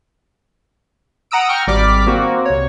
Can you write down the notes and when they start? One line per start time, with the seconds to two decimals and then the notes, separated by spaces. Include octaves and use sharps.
1.31 F#5 A#5 D#6 E6 D7
1.49 G5 A#5 C#6 F6
1.67 G#1 G3 D5 D6 F6 B6
2.07 A#3 C4 F#4
2.45 C2 C#5